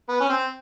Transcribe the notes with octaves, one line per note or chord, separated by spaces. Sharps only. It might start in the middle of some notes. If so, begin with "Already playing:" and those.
B3
C#4
C4